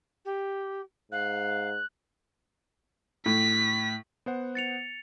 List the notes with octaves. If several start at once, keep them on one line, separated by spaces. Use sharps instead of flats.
G4
G#2 F5 F#6
A2 B6
B3 C5 F#5
A6 C#7 F7